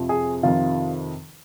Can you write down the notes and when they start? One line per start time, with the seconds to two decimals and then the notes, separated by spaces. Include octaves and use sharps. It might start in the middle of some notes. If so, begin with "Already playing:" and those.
Already playing: F2 C3 F3
0.09 G#4
0.43 F2 C3 D#3 F4